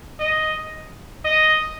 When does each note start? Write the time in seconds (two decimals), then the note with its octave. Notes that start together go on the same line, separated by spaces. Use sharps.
0.20 D#5
1.25 D#5